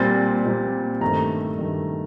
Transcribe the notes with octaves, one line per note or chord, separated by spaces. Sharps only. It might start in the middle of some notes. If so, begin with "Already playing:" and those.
Already playing: A#2 G3 C4 A6
A#2 G3 C4
G2 D#3 A3 A#5
G2 D#3 A3